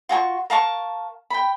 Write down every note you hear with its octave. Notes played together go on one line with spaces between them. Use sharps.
F4 F#4 G#5 C#6
A#4 F5 A5 C#6
G5 B5